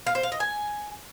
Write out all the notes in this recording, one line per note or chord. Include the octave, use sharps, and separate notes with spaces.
F5
C5
F5
D#5
G#5